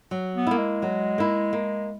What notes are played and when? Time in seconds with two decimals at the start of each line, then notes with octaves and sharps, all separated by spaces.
0.11 F#3
0.35 B3
0.47 A#3 E4
0.58 G#3
0.82 F#3
1.18 A#3 E4
1.53 A#3